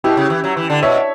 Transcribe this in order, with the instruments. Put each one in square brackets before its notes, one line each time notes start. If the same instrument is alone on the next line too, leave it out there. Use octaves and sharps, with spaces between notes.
[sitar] B2 [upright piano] E4 G4
[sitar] C#3
E3
F#3
E3
D3
[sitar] B2 [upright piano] C#5 E5